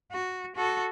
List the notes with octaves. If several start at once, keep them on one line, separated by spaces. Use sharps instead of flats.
F#4
F#4 A4